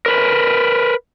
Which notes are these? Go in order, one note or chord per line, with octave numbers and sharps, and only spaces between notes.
A#4 B4